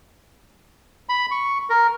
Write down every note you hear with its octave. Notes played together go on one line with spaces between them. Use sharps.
B5
C#6
A#4